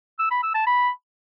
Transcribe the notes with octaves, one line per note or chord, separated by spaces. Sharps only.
E6
B5
E6
A5
B5